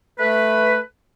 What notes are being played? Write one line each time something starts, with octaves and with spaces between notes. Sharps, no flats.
A3 B4